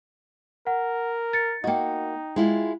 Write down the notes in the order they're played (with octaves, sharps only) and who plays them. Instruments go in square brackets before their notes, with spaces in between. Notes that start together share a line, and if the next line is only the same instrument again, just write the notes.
[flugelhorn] A#4 [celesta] F#5
[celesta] A6 C#7
[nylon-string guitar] A#3 F#4 [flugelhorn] D#4 [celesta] D#5 G5
[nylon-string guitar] G#3 E4 F4